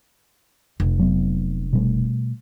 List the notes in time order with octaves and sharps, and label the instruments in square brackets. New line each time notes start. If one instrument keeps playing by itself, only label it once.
[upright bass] F1
[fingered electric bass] F#3 B3
B2 G3 A3